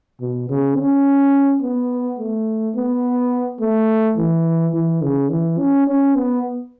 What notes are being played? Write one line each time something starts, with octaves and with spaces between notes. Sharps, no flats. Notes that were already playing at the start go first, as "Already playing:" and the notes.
B2
C#3
C#4
B3
A3
B3
A3
E3
E3
C#3
E3
C#4
C#4
B3